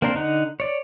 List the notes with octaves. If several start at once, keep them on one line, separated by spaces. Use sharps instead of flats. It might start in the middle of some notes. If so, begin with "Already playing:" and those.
A#3 C4 D4 A#4 C5
D3 D#4 F#5
C#5 D5